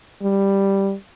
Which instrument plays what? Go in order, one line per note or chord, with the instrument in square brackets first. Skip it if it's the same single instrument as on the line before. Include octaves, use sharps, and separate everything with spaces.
[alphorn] G3